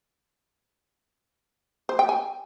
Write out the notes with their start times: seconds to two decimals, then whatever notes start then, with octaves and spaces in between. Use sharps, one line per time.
1.89 C5
1.99 G5
2.09 G#5